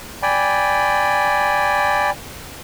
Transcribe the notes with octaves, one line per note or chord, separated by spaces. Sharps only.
D5 G5 G#5 B5